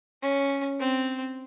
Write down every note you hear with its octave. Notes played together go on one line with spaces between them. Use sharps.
C#4
C4